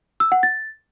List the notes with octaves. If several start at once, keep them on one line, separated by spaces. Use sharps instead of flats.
E6
F#5
A6